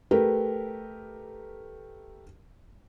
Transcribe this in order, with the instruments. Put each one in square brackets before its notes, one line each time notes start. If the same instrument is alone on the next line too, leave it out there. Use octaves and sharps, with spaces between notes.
[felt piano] A3 G4 A#4 B4